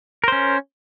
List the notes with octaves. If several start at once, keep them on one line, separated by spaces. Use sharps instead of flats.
C#4 A#4 C5